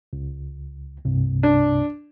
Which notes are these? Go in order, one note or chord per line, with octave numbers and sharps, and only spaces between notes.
C#2
C2 G2 C3
D4